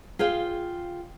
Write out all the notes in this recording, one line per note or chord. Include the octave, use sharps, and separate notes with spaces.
F4 G#4 F5 G5